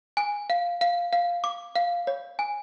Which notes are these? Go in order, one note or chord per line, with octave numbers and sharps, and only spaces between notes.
G#5
F5
F5
F5
D6
F5
C#5
G#5